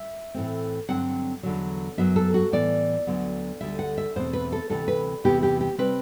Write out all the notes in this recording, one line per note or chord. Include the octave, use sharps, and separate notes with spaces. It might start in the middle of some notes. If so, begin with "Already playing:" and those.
Already playing: E5
A2 E3 A3 C4
G2 D3 F#3 C4 F#5
E2 D3 F#3
F#2 F#3 B3 E5
A4
F#4
A2 E3 B3 D5
D2 D3 F#3 B3
D2 D3 G3 E5
F#5
E5
E2 B2 A3 C4 C5
B4
A4
D2 C3 E3 A4
B4
E2 C3 E3 B3 G4
G4
G4
C3 G3 C4 B4